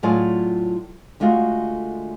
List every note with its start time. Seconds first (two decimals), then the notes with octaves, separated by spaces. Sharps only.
0.03 A2 F#3 F4 G#4 D5 G#5
1.20 D3 G#3 A3 F4 F#4